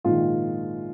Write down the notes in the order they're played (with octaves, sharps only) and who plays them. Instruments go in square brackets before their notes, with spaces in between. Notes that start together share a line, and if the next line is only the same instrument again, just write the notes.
[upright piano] A#1 G#2 D#3 F4